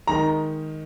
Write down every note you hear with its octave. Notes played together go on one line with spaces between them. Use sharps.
D#3 G#3 D#4 A#4 A#5